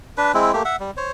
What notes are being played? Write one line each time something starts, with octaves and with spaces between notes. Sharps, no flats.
D4 B4
G#3 C4 E4
A3 A#3 G4
E5 F#5
G3
C5 C#5